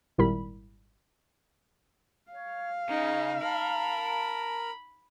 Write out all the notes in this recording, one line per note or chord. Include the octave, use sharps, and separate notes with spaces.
G#1 A#2 G3 E4 A#4 B5
C#5 F5
C#3 D#4 G#4
A#4 A5 B5